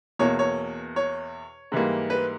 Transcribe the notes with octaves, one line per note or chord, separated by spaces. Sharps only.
E2 B2 A#3 C#5
C#5
C#5
G#2 E3 G3 A#3
B4